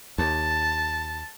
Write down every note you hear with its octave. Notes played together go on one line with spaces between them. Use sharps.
D#2 A5